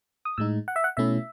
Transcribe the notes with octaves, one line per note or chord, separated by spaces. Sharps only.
D#6
A2 G#3 D#4 E6
F#5
E5
F#5
B2 A3 C#4 E4 E5